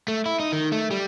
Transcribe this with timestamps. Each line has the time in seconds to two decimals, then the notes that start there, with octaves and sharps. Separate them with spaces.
0.08 A3
0.26 E4
0.40 D#4
0.52 D#3
0.72 A3
0.91 G3